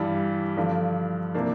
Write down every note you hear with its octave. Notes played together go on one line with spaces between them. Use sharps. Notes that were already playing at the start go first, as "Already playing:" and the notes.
Already playing: G2 E3 G3
G2 D3 F3
C3 E3 A#3 D4